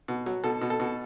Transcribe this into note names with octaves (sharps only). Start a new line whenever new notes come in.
B2
F#3
B2 A4
B2
A4
B2